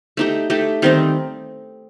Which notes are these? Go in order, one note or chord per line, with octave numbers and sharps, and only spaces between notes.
A3 D#4 G4
A3 D#4 G4
D#3 G3 C4 D#4